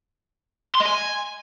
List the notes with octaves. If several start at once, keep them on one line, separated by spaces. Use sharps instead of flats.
C6
D#5
G#5